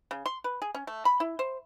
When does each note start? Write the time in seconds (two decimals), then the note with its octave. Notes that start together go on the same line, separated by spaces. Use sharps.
0.11 C#3
0.26 C6
0.44 B4
0.62 G#4
0.74 C#4
0.87 A3
1.05 B5
1.20 E4
1.39 C5